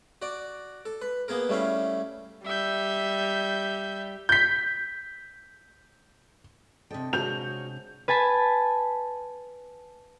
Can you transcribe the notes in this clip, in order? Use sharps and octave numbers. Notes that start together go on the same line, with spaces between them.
F#4 D5
A4
B4
A#3 B3 G#4 A#4
G3 A3 C#4 E4 F5
G3 E5 G6
G6 B6
C3 D4 A4 D#5 G5
C3 G#3 F4 F#4 C#5 G6 F7
B4 G#5 A5 B5